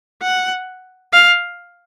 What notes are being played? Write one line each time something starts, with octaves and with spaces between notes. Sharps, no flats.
F#5
F5